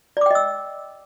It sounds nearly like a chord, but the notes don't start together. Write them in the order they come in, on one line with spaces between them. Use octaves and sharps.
D5 D6 G5 D#5 E6